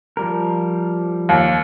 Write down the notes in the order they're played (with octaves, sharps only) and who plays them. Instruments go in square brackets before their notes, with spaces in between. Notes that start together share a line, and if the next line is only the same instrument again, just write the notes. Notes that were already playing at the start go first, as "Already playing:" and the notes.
[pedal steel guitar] F3 G3 A#4
[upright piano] D#2